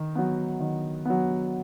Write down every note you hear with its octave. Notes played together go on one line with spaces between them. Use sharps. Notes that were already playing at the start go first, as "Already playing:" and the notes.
Already playing: D#3
F#3 B3
D#3
F#3 B3